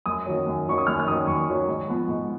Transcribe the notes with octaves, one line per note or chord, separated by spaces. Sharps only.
F#2 D#6
D#3 F#3 C#4
F#2
D#3 F#3 C#4 C#6
D#6
F#2 F6
F6
D#3 F#3 C#4 D#6
F#2 C#6
D#3 F#3 C#4
G#2
F3 B3
G#2